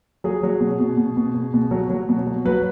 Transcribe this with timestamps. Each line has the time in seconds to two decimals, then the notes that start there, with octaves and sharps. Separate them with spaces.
0.24 F#3 G#4
0.43 F#3
0.61 B2
0.80 B2
0.97 B2
1.17 B2
1.35 B2
1.54 B2
1.71 F#3
1.90 F#3
2.09 B2
2.27 F#3
2.45 F#3 B4